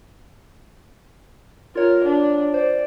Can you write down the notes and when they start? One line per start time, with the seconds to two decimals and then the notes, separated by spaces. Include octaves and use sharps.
1.75 F4 A#4 C#5
2.05 D4
2.54 C5 D5